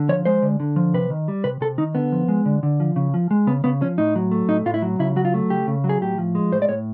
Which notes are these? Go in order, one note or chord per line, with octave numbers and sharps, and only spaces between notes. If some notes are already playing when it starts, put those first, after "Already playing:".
Already playing: D3
F3 C#5
G#3 C5
D3
D3
F3
C3 B4
D#3
G3
C3 B4
C3 A4
D#3 D#4
D3 B3
F3
G#3
D3
D3
F3
C#3
F3
G#3
C#3 B3
C#3 B3
F3 C#4
A2 D#4
F#3
A3
A2 D#4
A2 F4
E4
F#3
C#3 E4
F#3 F#4
F4
A3
C#3 G4
C#3
F#3
G#4
A2 G4
F3
G#3
A2 C5
D5
A2 C#5